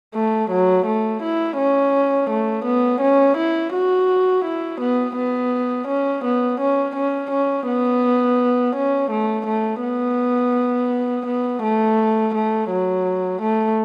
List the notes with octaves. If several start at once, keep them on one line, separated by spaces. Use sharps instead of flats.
A3
F#3
A3
E4
C#4
A3
B3
C#4
E4
F#4
E4
B3
B3
C#4
B3
C#4
C#4
C#4
B3
C#4
A3
A3
B3
B3
A3
A3
F#3
A3